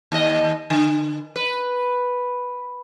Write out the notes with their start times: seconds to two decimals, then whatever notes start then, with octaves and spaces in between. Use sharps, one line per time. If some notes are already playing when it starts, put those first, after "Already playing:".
0.12 D#2 D#5
0.70 D3
1.36 B4